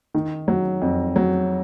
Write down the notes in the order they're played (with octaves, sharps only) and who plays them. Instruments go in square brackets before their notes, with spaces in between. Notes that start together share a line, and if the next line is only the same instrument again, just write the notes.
[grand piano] D#3
F#3
F2
F#3